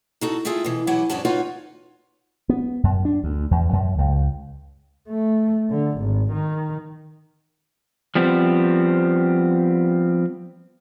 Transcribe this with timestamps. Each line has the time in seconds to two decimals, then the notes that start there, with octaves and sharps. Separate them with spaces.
0.21 D#4 F#4 A4
0.45 F4 G#4 A4 E5 G5
0.64 B2 E3
0.87 E3 F#3 E4 G4 F#5 G#5
1.09 E2 G#2 C#4 D4 F#4 A5
1.25 D#4 F4 F#4 B4 C#5
2.49 B3
2.83 F#2
3.05 D4
3.24 D2
3.51 E2
3.73 F#2
3.98 C#2
5.08 A3
5.70 D3
5.99 G#1
6.32 D#3
8.15 F3 G3 B3 C4